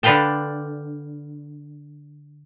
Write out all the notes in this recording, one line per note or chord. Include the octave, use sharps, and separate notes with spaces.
D3 D4 B4 F5 G5 A5